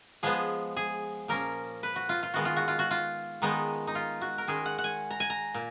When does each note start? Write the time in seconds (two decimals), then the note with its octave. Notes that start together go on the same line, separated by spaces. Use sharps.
0.23 F3 G#3 B3 G#4
0.77 G#4
1.28 A#2 F3 A#3 C#4 A#4
1.83 B4
1.96 F#4
2.09 F4
2.23 F4
2.34 D#3 G#3 B3 F#4
2.45 F4
2.56 F#4
2.68 F4
2.79 F#4
2.91 F4
3.42 D#3 G#3 B3 D#4
3.87 D#4
3.95 F4
4.21 F#4
4.38 A#4
4.47 D#3 G#3 C#4 G#4
4.66 F#5
4.78 F#5
4.84 G#5
5.11 A#5
5.20 G#5
5.30 A#5
5.54 A#2